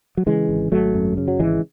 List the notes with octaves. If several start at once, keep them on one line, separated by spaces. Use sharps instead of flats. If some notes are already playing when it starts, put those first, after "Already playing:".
F#3
C#3 E3 G#3
G#1
G#1 F#3 A3
F#2
C#3
F#3
G#1 E3 G#3